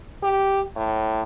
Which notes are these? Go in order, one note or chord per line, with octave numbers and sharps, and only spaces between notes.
G4
A2